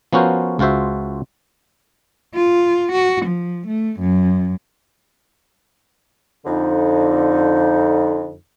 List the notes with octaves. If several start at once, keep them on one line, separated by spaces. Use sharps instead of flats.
F3 B3 C#4 F#4 A#4 C5
C#2 F4 F#4 C5 E5
F4
F#4
F3
A3
F#2
F2 D3 D#4